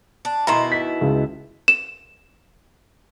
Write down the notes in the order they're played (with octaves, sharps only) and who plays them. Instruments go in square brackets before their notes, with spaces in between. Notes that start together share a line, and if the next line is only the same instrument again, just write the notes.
[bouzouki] D4
[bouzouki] B2 D#3 E4 [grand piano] A#5 C6
[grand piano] B6
C#2
[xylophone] E7